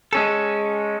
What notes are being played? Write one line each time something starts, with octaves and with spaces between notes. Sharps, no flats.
G#3 C#4 A4